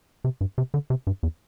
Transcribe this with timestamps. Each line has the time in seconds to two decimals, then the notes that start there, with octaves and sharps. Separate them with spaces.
0.24 C3
0.41 G2
0.58 C3
0.74 D3
0.90 C3
1.07 G2
1.23 E2